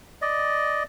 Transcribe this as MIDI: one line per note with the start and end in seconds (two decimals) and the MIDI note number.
0.22 0.83 74
0.22 0.83 75